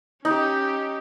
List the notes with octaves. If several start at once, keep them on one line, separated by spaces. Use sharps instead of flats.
C#4 D#4 G4